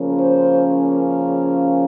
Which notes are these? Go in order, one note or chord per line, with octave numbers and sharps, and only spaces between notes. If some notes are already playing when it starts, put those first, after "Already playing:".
Already playing: C#3 F3 A#3 C#4
C5